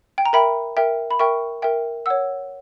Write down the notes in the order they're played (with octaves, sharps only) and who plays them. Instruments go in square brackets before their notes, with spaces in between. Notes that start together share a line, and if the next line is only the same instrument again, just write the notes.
[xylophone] G5
A#5
A#4 E5 G5 B5
A#4 E5 G5
B5
A#4 E5 G5 C#6
A#4 E5 G5
C#5 F#5 E6